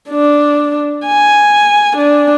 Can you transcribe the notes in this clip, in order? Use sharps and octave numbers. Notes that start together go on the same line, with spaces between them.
D4
G#5
D4